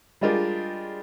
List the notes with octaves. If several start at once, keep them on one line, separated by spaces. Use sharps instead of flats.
G3 G#3 D4 F4 G4 A#4